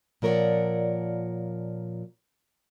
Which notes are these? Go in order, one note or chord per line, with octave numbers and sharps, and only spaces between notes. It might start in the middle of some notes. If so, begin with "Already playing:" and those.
A#2 F3 A#4 C#5 D5 F#5